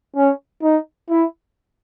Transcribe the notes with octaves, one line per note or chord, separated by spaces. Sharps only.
C#4
D#4
E4